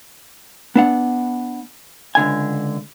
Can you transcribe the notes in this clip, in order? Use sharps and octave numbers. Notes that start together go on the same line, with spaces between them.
B3 D4 F#5
C#2 D3 G#5